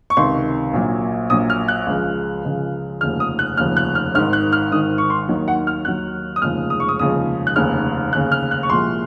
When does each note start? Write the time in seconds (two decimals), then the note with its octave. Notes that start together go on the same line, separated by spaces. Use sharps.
0.10 C#6
0.17 C#2 C3 D#3 C6
0.73 A#1 A#2 F#3
1.30 A#1 A#2 F#3 D#6
1.50 F6
1.68 F#6
1.87 C#2 C#3 F3 G#3
2.44 C#2 C#3 F3 G#3
3.01 F1 D#2 C#3 F3 F6
3.20 D#6
3.39 F#6
3.57 F1 D#2 C#3 F3 F6
3.77 F#6
3.95 F6
4.15 G#1 G#2 D#3 F6
4.33 F#6
4.52 F6
4.72 G#1 G#2 D#3 D#6
4.98 C#6
5.10 C6
5.28 D#2 D#3 F#3
5.48 F#5
5.67 F6
5.85 D#2 D#3 F#3 F#6
6.36 D#6
6.42 F1 D#2 C#3 F3 G#3 F6
6.70 D#6
6.80 C#6
6.89 D#6
6.99 F1 D#2 C#3 F3 G#3 D#6
7.47 F#6
7.56 F1 D#2 C#3 F6
8.13 F1 D#2 C#3 F#6
8.32 F6
8.51 F#6
8.63 C#6
8.70 C2 A#2 F3 G#3 C6